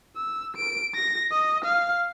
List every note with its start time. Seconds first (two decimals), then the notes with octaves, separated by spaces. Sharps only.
0.17 E6
0.57 D7
0.95 A#6
1.32 D#5
1.65 F5